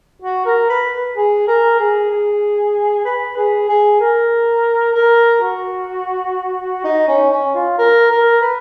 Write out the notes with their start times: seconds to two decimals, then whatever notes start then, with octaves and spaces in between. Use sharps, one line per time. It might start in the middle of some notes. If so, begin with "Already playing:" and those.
0.22 F#4
0.45 A#4
0.69 B4
1.17 G#4
1.48 A#4
1.79 G#4
2.11 G#4
3.05 B4
3.37 G#4
3.69 G#4
4.00 A#4
4.95 A#4
5.42 F#4
6.84 D#4
7.08 C#4
7.31 C#4
7.55 F4
7.78 A#4
8.10 A#4
8.41 B4